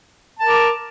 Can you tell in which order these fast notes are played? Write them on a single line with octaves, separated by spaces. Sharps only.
A5 A#4 D6